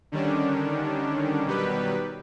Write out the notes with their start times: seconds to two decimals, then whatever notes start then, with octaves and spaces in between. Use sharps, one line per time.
0.12 D3 D#3 G3 C#4 D4
1.46 B2 D#3 F#3 G3 G4 B4